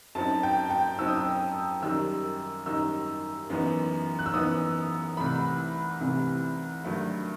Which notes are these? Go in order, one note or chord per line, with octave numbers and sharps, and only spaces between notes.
F#2 F#3 C4 D#4 A5
G5
G5
F#2 F#3 C4 D#4 E6
D#6
E6
F#2 D#3 G3 D#4 E6
F#2 D#3 G3 D#4 E6
F#2 E3 B3 D#4
F#6
E6
F#2 E3 B3 D#4 D#6
C2 C3 E3 A3 B5
C2 C3 E3 A3
G2 D#3 F#3 A3